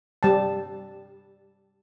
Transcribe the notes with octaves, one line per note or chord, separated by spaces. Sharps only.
G3 A5